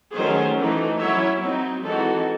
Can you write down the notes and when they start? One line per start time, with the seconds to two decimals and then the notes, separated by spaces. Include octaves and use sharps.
0.15 D#3 F#3 A3 C#4 G#4 C5
0.58 E3 A3 D#4
1.00 F#3 C#4 E4 C#5 E5
1.42 F#3 C4 D#4
1.84 E3 G#3 C4 D#4 F#4 A4